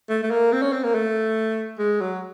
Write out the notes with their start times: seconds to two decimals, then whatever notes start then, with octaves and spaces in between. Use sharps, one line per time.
0.09 A3
0.23 A3
0.31 A#3
0.52 C4
0.62 C#4
0.73 C4
0.83 A#3
0.95 A3
1.79 G#3
2.01 F#3